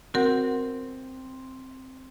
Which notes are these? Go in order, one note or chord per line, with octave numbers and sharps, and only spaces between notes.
C4 F#4 A#4 F#5